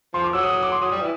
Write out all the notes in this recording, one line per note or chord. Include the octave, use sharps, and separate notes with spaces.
F3 C6
D6
F#3 E6
D#6
D#6
D6
C6
F#3 D#6
G3 D#6
E3